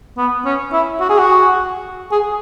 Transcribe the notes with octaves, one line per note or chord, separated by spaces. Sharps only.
B3
C#4
E4
F#4
G#4
F#4
G#4